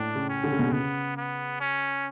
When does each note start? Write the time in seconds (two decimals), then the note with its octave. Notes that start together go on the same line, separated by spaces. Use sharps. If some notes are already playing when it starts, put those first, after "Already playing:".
Already playing: A2 D4
0.15 C#3
0.29 C#4
0.44 D3
0.52 C#3
0.59 B2
0.67 C#3
0.73 B3
1.17 B3
1.61 C#4